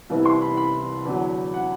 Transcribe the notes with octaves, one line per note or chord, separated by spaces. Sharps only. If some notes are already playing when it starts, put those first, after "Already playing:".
C2 C3 E3 B3 E4
C6
B5
B5
E2 D3 F#3
F#5